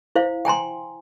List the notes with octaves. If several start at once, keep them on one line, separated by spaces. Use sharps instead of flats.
E4 C5 F5
G5 G#5 A#5 C6